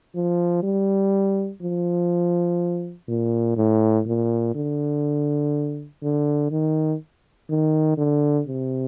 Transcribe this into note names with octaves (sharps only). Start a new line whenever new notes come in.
F3
G3
F3
A#2
A2
A#2
D3
D3
D#3
D#3
D3
C3